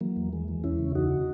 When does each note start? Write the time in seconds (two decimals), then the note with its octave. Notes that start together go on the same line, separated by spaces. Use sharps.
0.01 E3 F#3 A#3
0.17 E2
0.33 E3 G#3
0.48 E3
0.64 E2 C#4 E4
0.79 C#3
0.95 E2 D#4 F#4